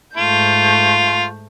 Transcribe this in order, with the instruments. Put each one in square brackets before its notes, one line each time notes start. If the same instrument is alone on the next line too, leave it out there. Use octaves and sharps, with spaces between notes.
[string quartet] G#2 A3 G6 [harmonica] F4